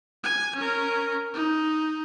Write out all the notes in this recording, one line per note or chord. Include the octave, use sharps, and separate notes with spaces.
G#5 G#6
C#4 A#4
D#4